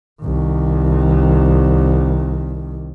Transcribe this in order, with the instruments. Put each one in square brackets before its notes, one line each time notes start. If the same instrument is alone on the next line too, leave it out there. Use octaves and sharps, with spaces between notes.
[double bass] C2 D#3